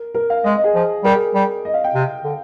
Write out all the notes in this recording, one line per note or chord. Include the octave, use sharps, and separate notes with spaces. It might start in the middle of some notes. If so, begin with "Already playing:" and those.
Already playing: A#4
A#4
F5
G#3 D#5
D#5
G#4
F3
G3 A#4
G#4
G3
D#5
F5
G5
C3
D3